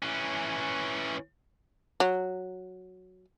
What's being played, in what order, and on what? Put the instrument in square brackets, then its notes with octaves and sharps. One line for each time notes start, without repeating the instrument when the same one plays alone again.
[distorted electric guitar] E3 C#4
[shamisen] F#3